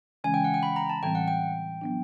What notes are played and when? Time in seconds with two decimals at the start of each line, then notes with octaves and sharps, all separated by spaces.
0.24 C#3 E3 G#3 C#4 G#5
0.34 G5
0.44 F#5
0.54 G5
0.63 B5
0.76 A#5
0.89 A5
1.03 A2 E3 G3 C4 G5
1.15 F#5
1.28 G5
1.81 F#3 B3 D4